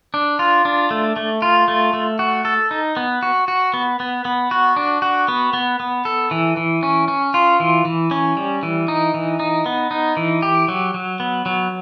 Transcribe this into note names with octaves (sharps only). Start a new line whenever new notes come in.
D4
F4
D4
A3
A3
F4
A3
A3
F#4
A4
D#4
B3
F#4
F#4
B3
B3
B3
F#4
D4
F#4
B3
B3
B3
A4
E3
E3
C#4
C#4
F4
E3
E3
C#4
G3
E3
D#4
E3
D#4
B3
D#4
E3
G4
F#3
F#3
B3
F#3